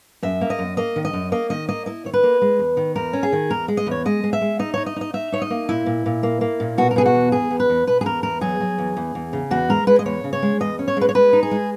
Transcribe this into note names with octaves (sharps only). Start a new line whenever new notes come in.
F#2 E5
A#3
D#5
F#2
A#3 D#5
D#3
D#5
F#2
A#3 D#5
D#3 D#5
A#3 D#5
E4 D#5
D#3 C#5
B4
A#3
G#3
E2
D#3
E2 A#4
C#4
G#4
D#3
E2 A#4
G#3
D#5
E2 C#5
G#3 D#5
G#3
E5
G#3
D#4 D#5
D#4 C#5
D#5
D#4 D#5
D#4 E5
D#4 C#5
D#5
A#3
A#2 E4
A#2
A#2
A#3
A#3
A#2
B2 F#4
A#4
B2 G#4
F#4
E2
E2 G#4
E2
B4
E2
B2 B4
G#4
E2 A#4
E2 A#4
F#3 G#4
F#3
E2
E2
E2
C#3
E2 F#4
G#3 A#4
G#3 B4
D#5
E2 C#5
C#3
C#5
G#3
E2 D#5
C#4
C#5
G#3 B4
C#5
G#3 B4
D#4
G#4
G#3